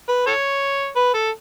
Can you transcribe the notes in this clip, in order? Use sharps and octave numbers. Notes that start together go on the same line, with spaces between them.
B4
A4 C#5
B4
A4